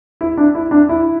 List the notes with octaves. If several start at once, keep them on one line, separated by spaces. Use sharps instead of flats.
E4
D4
E4
D4
E4